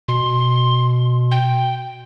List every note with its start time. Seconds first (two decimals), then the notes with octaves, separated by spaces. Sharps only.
0.08 B2 C6
1.31 G5